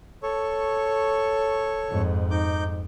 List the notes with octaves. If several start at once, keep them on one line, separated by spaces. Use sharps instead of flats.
A4 C#5 C#6
F2 G#2
D#4 D6 G6